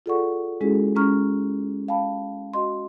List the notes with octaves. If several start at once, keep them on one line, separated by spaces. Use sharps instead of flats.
F4 G#4 A4 D5 F#5 C#6
G#3 C#4 E4 F#4 G#4 A4
G#3 C#4 A#5 C#6 F6
F5 G5 A5 B5
F#4 D#5 C6